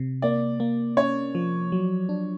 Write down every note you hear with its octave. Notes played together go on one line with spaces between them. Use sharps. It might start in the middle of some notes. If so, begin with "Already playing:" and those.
Already playing: C3
A#3 D5
A#3
C#4 C#5
F3
F#3
D4